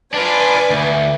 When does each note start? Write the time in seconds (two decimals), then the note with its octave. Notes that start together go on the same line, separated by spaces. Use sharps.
0.14 D4 F4 B4 D5 G#5
0.70 D2